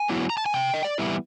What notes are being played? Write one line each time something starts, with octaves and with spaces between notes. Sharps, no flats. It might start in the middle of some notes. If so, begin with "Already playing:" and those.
Already playing: G#5
F#3 B3 E4
A#5
A5
G#5
C3 G5
D#5
D5
E3 G3 B3 E4